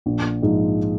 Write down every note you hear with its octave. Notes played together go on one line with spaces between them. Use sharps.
A#1
G#2 F3 G#3